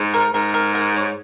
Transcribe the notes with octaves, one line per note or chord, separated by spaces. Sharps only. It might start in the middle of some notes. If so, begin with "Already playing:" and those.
Already playing: G#2
A#4
G#2 A#4
A#4
A#4
C#5